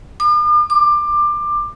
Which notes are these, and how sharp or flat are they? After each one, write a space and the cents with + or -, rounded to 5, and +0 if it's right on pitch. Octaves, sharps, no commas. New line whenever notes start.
D6 +45
D6 +20